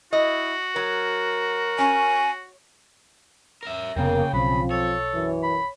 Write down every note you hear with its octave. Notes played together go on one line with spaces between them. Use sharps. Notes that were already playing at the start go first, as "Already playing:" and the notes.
E4 F#4 D#5
F#3 A#4
C#4 G#5
A#4 E5
F1 C#3 A#3 B3 G5
B1 F3 C4 B5
A4 C#5
F#2 E3
B5